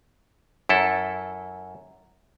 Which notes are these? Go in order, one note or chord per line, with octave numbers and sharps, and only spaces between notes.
F#2 E4 A4